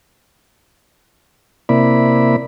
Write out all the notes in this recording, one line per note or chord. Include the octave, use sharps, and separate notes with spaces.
C3 A#3 E4 D5 B5